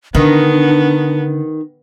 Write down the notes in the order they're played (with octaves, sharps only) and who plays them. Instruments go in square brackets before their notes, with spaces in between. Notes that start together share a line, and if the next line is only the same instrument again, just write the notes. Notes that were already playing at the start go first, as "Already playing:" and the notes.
[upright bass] D3 [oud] D#3 [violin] B3 [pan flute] D4